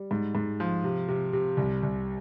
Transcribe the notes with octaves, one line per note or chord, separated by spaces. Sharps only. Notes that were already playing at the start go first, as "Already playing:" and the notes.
Already playing: G3
G#2
G#2
F3
C3
C3
C3
C2
C2